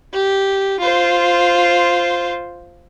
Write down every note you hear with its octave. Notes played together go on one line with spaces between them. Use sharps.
G4
F4 C5